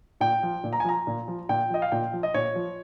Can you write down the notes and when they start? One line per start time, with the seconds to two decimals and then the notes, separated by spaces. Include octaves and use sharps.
0.20 A#2 G5
0.43 F3
0.64 A#2
0.73 A#5
0.80 G#5
0.84 F3 A#5
1.07 A#2
1.28 F3
1.49 A#2 G5
1.70 F3 D#5
1.82 F5
1.92 A#2 G5
2.13 F3
2.23 D#5
2.34 A#2 C#5
2.55 F3